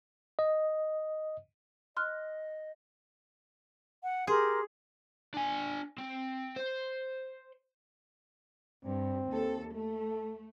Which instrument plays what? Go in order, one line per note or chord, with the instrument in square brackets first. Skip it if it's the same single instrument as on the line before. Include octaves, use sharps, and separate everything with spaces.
[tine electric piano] D#5
[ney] D#5 [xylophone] C6 F6 F#6
[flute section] F#5
[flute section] G4 A#4 C6 [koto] G#4
[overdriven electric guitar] D4 G#5
C4
C5
[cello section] G2 [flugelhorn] C4
[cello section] D#2 A4
[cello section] A3 [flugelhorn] A4